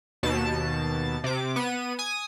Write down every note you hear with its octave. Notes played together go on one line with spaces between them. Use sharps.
D#2 B2 A5
C3 D6
B3 D#7
G#5 D#6